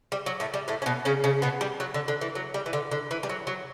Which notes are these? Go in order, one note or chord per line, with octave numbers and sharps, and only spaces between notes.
G3
F#3
A2 A3
G3
A2 A3
C#4
B2 B3
C#3 C#4
C#3 C#4
B2 B3
G3
F#3
D3
D3
E3
F#3
G3
E3
D3
D3
E3
G3
F#3
F#3